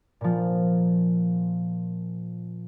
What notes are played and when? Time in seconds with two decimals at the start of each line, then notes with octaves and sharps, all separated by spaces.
0.21 A#2 F3